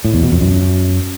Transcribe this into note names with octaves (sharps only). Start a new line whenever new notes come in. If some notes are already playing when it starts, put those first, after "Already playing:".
A2
E2
B2
F2
F#2